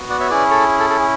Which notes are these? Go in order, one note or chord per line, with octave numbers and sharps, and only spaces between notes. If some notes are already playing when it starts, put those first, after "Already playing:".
Already playing: B3 F#4
D5 F#5
C#5 E5
C#4 E4 G#4 B4 D5
A4 C#5
A4
A4
G#4